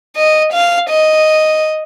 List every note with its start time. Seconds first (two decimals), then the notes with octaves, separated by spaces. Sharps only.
0.16 D#5
0.52 F5
0.89 D#5